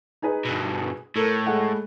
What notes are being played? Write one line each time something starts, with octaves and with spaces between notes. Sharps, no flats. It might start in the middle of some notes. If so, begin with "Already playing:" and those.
D#4 G#4 B4
G2 B2
A2 A4 A#4
G#3 A3 F#5